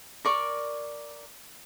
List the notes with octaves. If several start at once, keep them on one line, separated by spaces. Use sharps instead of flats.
A#4 D5 C#6